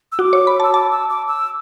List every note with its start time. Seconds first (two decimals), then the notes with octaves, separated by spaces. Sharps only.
0.12 E6
0.19 F#4 D6
0.33 C#5
0.47 B5
0.60 A5 E6
0.74 A5 D6
0.92 E6
1.10 D6
1.28 E6